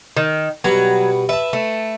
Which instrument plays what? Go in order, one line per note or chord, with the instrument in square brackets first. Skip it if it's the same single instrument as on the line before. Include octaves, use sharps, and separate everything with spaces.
[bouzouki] D#3
[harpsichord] B2 G3 B3 [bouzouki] F#3
[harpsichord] B4 A5 [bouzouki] E5
[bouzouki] A3